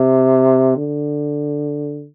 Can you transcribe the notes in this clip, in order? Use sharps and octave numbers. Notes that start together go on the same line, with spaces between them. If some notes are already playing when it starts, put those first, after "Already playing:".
Already playing: C3
D3